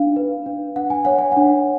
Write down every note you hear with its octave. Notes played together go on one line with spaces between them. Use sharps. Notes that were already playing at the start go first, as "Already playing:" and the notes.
Already playing: D4 F5
B4
D4
D4 F#5
G#5
C#5 F#5
G#5
D4 F#5